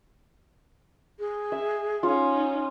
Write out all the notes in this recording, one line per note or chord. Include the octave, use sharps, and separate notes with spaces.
G#4
E5
C#4 D#4 F4